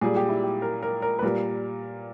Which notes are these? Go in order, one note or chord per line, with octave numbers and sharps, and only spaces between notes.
A#2 G3 G#4
G4
E4
G4
A#4
A#4
A#4
B4
A#2 G3 A#4